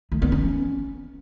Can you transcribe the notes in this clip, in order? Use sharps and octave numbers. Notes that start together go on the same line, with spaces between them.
A3
B3
C#4